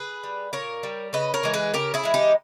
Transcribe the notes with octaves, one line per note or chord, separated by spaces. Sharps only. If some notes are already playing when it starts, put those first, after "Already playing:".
Already playing: G#4 B4
G3
A#2 A#4 C#5
G3
C#3 B4 D#5
A#4 C#5
E3 G#3
G#4 B4
C#3 G4 A#4
E4 G#4
E3 G#3
D#4 G4